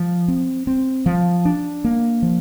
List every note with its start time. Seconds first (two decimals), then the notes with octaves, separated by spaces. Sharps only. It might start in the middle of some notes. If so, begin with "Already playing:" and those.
Already playing: F3
0.28 C4
0.67 C4
1.06 F3
1.45 D4
1.84 A#3
2.22 F3